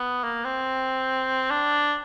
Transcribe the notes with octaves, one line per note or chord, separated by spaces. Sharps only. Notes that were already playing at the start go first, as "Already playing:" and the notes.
Already playing: B3
A#3
C4
D4